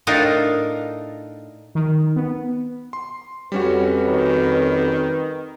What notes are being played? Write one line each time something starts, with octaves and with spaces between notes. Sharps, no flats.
A2 D4 D#4 F4 A4 A#4
D#3
B3
C6
F2 G3 C#4 F#4 B4
D#3